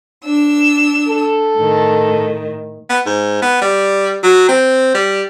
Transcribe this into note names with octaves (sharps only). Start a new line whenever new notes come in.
D4 E6
A4
A2 D#3
B3
G#2
B3
G3
F#3
C4
G3